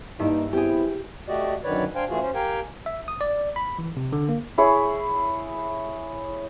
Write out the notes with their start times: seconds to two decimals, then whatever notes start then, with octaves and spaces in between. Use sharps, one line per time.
0.19 G2 A#3 D#4 E4 D6
0.53 B3 C4 E4 G4 G#4
1.28 A3 F#4 G4 D5 D#5
1.64 F#2 D3 D#3 B4 C#5 D5
1.95 D4 C5 F5 G5 G#5
2.09 C#3 E3 A3 F4 F#4 G#4
2.21 C#4 C5
2.35 G4 A#4 F5 G5 G#5
2.86 E5
3.08 D#6
3.21 D5
3.56 B5
3.79 E3
3.97 C3
4.13 D3
4.29 A#3
4.58 E4 G#4 C#5